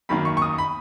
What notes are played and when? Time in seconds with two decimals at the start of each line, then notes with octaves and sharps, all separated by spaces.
0.09 F#2 D#3 A#3 B5
0.25 C#6
0.37 C#6
0.42 D#6
0.58 B5